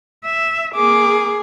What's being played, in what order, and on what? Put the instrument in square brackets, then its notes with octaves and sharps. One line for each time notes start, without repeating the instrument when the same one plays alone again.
[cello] E5
[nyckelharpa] A#3 D6 [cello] G#4